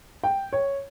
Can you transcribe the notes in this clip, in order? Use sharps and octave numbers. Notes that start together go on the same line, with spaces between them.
G5
C#5